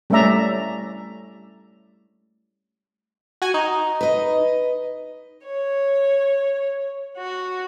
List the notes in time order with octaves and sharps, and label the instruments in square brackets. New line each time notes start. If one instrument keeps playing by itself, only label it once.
[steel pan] G3 A3 C#4 D5 E5 A#5
[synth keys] F#4 G#5
D#4
[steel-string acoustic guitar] B4 D#5
[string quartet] C#5
F#4